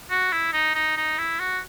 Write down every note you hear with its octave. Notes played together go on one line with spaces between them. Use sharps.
F#4
E4
D#4
D#4
D#4
E4
F#4